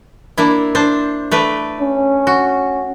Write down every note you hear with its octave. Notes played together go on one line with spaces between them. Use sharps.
A#3 D4 E4
D4 C5
A3 B4 D5
C#4
F#4